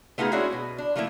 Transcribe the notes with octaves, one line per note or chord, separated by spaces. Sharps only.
A3 B3 D#4 F4 G#4
G#3 C#4 D4 E4 F#4 G#4
B2
D4
F3 A3 A#3 D#4 E4